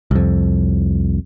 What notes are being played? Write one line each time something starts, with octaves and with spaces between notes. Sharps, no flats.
C2 F2